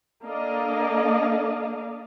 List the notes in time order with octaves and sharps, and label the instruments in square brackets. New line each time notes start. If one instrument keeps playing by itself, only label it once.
[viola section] A#3 D4 A4 D5 D#5 F5